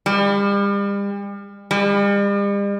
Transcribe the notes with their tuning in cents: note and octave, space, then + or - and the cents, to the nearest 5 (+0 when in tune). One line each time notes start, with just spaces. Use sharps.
G3 +40
G3 +45